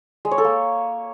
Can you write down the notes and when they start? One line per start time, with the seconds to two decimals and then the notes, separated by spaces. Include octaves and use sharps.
0.25 G#3
0.31 C#5
0.38 A4
0.45 A#3